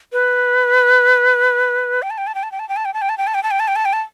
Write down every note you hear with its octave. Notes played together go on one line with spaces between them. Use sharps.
B4
G5
A5
G5
A5
G5
A5
G5
A5
G5
A5
G5
A5
G5
A5
G5
A5
G5
A5
G5
A5
G5
A5
G5
A5